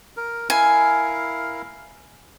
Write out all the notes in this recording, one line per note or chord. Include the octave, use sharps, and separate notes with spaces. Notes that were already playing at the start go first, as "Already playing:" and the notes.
A#4
E4 A#4 F5 G#5